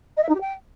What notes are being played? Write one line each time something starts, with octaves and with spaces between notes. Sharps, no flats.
D#5
E5
D#4
G4
G5